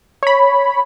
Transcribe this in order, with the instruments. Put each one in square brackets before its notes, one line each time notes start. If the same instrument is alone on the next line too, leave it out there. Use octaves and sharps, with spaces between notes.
[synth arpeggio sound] C#5 B5